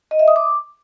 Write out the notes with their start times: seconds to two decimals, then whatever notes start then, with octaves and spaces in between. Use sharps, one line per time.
0.11 D#5
0.19 E5
0.28 D#6
0.36 D6